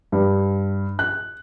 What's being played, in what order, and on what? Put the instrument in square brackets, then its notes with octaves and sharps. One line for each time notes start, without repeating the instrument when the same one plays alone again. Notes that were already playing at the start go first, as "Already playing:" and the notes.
[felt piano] G2
F#6